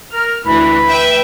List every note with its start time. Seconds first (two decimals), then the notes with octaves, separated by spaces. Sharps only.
0.13 A#4 F6
0.46 D2 E3 B5
0.88 B4 E5 G5